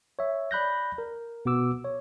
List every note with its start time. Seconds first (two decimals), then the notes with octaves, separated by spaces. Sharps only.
0.19 C#5 E5
0.51 D5 B5 F#6 G6 A#6
0.98 A#4
1.45 B2 B3 F#4 D6 E6
1.84 C#5